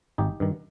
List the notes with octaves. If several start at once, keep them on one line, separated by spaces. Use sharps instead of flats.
G#1 D#4 G4
G2 D#3